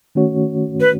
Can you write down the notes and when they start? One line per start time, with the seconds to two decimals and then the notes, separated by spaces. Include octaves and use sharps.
0.15 D#3 A3 C#4 F#4 C#5
0.80 B4